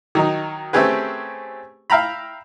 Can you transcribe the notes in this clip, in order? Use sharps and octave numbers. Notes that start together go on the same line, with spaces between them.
D#3 F#3 D#4
A3 C4 C#4 G4 G#4 B4
E5 F5 G5 A#5 B5